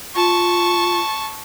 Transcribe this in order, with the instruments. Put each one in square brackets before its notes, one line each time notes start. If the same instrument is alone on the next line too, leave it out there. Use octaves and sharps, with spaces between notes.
[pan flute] F4 [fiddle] A5 C#6